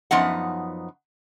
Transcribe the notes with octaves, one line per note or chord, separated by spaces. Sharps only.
F#2 F3 B3 D#4 F#5